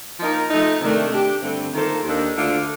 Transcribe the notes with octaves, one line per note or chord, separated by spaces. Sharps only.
F3 A#3 D#4 A#4
F3 A3 D#4
C3 D#3 A3 D4
A3 D4 G4
G2 D3 A3 C4
D#3 A#3 F4 A4 C5
D#2 D#3 A#3 D4 A4
D2 D3 A3 D4 F4